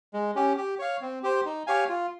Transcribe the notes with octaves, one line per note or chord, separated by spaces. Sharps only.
G#3
C#4 G4
G4
C#5 F5
C4
G4 C5
D#4
G4 C#5 F5 G#5
F4